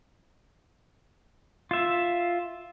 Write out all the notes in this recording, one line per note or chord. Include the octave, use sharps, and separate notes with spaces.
F4 E5